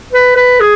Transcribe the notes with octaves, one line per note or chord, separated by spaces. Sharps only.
B4
B4
G#4